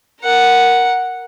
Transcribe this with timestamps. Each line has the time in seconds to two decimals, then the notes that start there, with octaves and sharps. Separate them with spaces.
0.21 A#4 F#5